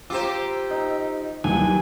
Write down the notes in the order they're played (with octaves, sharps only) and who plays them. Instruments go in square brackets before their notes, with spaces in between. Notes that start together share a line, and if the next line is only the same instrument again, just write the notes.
[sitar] F4 G4 C5 [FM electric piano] A#5 E6 [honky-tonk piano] D6
[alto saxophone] D#4 [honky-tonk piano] D#5
[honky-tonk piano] D#2 E3 [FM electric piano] F#3 G3 [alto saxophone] G#5